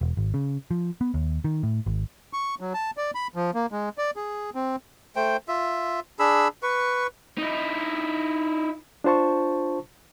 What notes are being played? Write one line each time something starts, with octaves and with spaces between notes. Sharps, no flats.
E1
G#1
C#3
F3
B3
D#2
D#3
A2
G#1
C#6
F#3
A5
D5
B5
F3
A#3
G#3
D5
G#4
C4
A3 C5 G5
F4 E5
D4 G#4 B5 E6
B4 C#6
D#4 E4
D4 F4 C5 A5 C#6